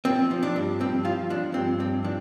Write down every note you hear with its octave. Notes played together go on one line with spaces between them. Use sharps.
F3 C4
F3
D4
G2
G2 C4
F3 F4
F3 D4
G2 C4
G2 C4
F3 D4